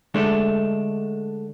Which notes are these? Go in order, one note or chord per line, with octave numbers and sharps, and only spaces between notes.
D3 G#3 A3 D4